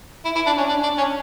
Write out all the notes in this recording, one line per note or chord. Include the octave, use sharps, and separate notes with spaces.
E4
E4
D4
C#4
D4
D4
C#4